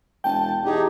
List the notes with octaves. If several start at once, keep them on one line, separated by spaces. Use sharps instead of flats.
E1 G5 A5
E2 D#4 G4 G#4